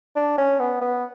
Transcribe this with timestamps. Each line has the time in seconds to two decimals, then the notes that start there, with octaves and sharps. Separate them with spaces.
0.16 D4
0.38 C#4
0.59 B3
0.81 B3